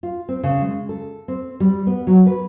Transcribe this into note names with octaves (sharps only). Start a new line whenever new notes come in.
F4
C4
C#3
G#3
A4
C4
G3
B3
F#3
B4